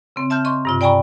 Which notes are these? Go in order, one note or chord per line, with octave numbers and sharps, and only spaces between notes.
C#3 C4
E5 A5 F6 G6
D#5 C6 C#6
G2 C3 F4
D5 G5 G#5 A#5 B5 C#6